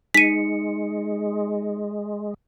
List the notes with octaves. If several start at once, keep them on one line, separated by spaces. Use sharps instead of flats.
G#3 D#4 B6 C#7 D#7